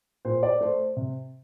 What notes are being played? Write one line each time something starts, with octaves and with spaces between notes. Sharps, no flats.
A#2 C5
D5
A3 C5
C3